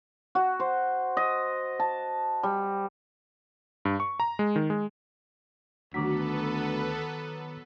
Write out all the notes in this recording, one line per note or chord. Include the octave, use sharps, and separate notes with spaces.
F#4
C5
D#5
A5
G3
G2
C#6
A#5
G#3
D#3
G#3
D2 D#3 F#3 B3 A4 B4 D6 B6